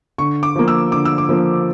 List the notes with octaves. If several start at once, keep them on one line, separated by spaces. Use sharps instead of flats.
D3 C#6
D6
F3 A#3
E6
D3 D6
E6
D6
F3 A#3